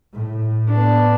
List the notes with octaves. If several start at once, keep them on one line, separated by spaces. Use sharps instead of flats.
A2
B3 D4